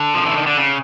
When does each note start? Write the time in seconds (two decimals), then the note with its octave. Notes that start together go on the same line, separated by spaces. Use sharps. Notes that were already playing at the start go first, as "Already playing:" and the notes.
Already playing: D3
0.14 F3
0.25 E3
0.36 D#3
0.46 D3
0.57 C#3